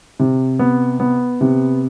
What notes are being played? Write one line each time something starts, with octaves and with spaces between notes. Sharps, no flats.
C3
B3
B3
C3